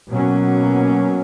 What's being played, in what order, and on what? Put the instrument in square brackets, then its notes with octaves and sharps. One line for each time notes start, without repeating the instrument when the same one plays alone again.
[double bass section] B2 F#3 A#3 C#4